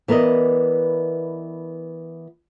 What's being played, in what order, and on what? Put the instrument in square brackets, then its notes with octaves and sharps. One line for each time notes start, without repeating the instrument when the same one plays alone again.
[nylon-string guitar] E3 B3 A#4 D5 D#5